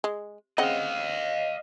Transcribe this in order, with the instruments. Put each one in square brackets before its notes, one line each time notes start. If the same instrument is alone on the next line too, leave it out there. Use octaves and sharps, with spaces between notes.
[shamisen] G#3
[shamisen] C#3 C4 F#5 [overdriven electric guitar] D#5 F5